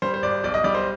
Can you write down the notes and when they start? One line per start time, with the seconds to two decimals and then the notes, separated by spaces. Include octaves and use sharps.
0.02 G3 C5
0.14 C5
0.22 G#1 D5
0.44 B1 D5
0.54 D#5
0.64 G3 D5
0.75 C5